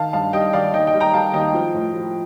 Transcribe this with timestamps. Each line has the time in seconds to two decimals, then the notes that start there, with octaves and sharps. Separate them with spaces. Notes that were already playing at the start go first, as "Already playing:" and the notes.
Already playing: D#3 F5 A5
0.13 G2 F5 A5
0.33 G3 D#5 G5
0.53 D#3 D5 F5
0.73 D#2 D#5 G5
0.87 D#5 G5
0.94 G3
1.00 G5 A#5
1.14 G3 F5 A5
1.33 D#2 D#5 G5
1.54 F3
1.74 A2
1.94 F3